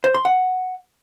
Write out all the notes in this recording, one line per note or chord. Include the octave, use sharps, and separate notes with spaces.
C5
C6
F#5